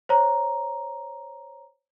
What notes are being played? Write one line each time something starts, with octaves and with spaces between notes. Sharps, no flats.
C5 C#5 A#5